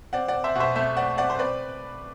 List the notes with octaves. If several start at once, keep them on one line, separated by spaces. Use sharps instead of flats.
C4 D5 F#5
D5 F#5
C4
C5 E5
B2 C5 E5 F#5
A3 C5 E5
C4 D5 F#5
C4 D5 F#5
C5
C4 B4 D5